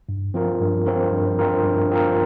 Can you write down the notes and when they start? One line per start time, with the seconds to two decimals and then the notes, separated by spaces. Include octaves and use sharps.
0.09 G2
0.34 F3 C4 F4 A#4
0.60 G2
0.86 F3 C4 F4 A#4
1.12 G2
1.39 F3 C4 F4 A#4
1.64 G2
1.90 F3 C4 F4 A#4